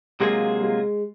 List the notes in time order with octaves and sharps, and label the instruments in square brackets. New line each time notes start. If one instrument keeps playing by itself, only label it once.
[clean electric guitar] C3 F#3 A#3 F4 G#4 [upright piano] G#3
[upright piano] G#3